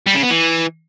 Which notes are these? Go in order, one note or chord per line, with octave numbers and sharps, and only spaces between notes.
G3
C#3
B3
E3